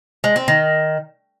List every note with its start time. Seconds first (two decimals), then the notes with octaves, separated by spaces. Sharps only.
0.24 G#3
0.36 C4
0.48 D#3